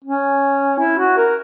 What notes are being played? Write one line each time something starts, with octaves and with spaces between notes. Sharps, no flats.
C#4
E4
F#4
A#4